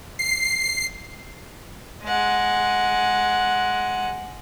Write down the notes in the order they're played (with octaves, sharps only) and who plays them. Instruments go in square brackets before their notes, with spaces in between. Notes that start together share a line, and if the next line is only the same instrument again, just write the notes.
[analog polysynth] C7
[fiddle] G#3 F#5